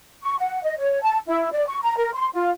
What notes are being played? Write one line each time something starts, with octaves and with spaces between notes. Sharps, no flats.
C#6
F#5
D#5
C#5
A5
E4
D5
C#6
A#5
A#4
C6
F4